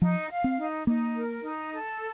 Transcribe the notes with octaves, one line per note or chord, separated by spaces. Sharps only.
F3 D#4
F5
C4
D#4
A#3 D#4
A#4
D#4
A4